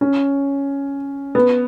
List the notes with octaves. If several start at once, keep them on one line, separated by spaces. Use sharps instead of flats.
C#4
B3